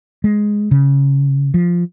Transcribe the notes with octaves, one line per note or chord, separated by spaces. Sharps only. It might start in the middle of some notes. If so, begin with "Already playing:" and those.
G#3
C#3
F3